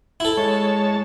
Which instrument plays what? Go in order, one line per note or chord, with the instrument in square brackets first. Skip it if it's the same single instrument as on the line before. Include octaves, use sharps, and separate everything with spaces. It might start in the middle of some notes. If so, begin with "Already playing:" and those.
[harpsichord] E4 A4
[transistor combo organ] G#3 C#5 A5